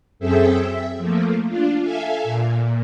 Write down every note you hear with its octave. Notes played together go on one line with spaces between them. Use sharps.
F#2 C4 G#4 A4 E5 G5
E5
F3 A3 A#3
D4 F4
A4 E5 F5 G#5
A#2